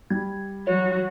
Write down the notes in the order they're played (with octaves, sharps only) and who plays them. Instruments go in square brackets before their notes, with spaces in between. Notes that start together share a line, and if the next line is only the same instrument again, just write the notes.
[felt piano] G3 [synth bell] G#6
[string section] F#3 [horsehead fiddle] F#4 [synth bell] C#5